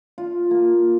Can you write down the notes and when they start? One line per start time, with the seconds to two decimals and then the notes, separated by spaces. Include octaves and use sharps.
0.18 F4
0.51 A#3